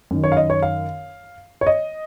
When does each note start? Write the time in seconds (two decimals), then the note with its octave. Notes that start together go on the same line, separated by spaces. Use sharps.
0.11 F#2 D#3
0.24 C#5
0.32 F5
0.37 D#5
0.50 C#5
0.63 F5
1.61 C#5
1.67 D#5